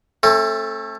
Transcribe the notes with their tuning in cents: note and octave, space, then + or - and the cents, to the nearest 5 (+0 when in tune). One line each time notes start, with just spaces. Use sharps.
A3 +0 C4 +45